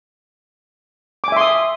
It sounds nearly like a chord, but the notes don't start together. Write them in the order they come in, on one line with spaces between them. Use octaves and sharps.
D6 G#5 E5 C6 D#6